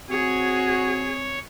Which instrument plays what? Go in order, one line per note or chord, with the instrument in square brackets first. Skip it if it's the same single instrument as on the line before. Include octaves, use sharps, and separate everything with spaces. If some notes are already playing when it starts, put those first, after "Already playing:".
[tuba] C4 [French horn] F#4 [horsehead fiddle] G#4 [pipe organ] C#5